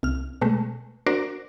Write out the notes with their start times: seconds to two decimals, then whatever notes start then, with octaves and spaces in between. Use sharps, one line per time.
0.03 C2 F6
0.41 B2 G#3 A3
1.07 D4 F#4 A#4 C5 D5